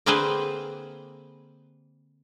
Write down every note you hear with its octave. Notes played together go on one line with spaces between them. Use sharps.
D3 A#3 C4 G#4 B4 C5